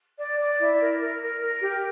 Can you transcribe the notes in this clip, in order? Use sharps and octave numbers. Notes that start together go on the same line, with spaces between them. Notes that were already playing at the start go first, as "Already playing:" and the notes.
D5
D5
E4
A#4
A#4
A#4
A#4
G4